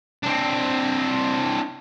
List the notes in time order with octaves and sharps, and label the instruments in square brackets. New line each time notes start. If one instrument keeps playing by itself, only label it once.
[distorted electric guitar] C4 D4